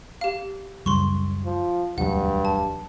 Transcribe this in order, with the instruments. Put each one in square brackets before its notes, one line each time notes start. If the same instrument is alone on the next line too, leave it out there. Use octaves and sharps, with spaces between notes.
[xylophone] G4 F5
[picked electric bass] C#2 F#2 G3 [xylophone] C6 C#6
[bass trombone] F3
[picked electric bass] E1 D2 F#3 [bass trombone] G2 [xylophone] F#5
[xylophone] A5